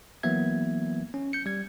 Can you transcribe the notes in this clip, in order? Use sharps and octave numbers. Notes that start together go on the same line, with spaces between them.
E3 F#3 A#3 B3 E5 G#6
C#4
G6 C#7
G3 G#6